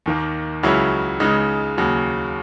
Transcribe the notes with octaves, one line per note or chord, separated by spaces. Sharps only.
D#2 D#3 A#3
C#2 C#3 F#3 C#4 E4
C#2 C#3 G#3 D#4
D#2 C#3 F#3